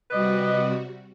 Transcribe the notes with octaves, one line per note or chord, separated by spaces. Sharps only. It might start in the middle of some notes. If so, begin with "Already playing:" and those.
C3 G3 F#4 B4 D5 D#5